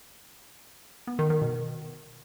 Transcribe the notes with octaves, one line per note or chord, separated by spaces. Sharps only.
B3
D#3
D#3
B2